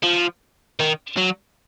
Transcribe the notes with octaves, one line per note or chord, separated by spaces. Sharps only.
F3
D#3
F#3